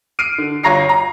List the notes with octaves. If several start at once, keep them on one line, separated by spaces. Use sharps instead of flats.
F6 C7 D7 D#7
D3
G1 F4 C#5 A#5 A#6 C7
A#5